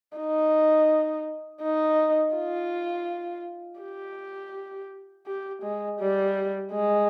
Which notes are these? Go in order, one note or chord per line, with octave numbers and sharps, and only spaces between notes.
D#4
D#4
F4
G4
G4
G#3
G3
G#3